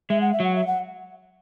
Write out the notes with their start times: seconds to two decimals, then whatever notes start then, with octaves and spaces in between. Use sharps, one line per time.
0.10 G#3 E5
0.21 F#5
0.33 E5
0.40 F#3 F#5
0.56 E5
0.67 F#5